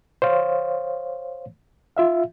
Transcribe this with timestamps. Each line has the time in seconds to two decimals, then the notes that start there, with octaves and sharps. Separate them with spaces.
0.22 C5 C#5 F5
1.96 F4 E5 F5